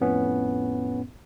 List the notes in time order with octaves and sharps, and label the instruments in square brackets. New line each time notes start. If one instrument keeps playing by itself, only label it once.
[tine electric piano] F2 A2 B3 C#4